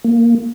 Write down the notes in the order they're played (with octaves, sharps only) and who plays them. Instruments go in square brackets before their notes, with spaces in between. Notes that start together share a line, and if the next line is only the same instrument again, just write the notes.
[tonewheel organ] A#3